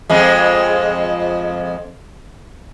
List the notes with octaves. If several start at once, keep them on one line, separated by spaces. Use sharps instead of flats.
F2 F3 G#3